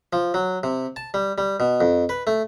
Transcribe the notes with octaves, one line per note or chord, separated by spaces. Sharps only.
F3
F#3
C3
A5
G3
G3
B2
F2
B4
A3